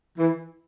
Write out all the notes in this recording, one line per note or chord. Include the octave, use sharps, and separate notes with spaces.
E3